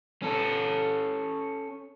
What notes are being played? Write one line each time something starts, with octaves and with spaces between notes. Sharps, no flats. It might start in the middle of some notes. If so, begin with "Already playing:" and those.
C#4 A4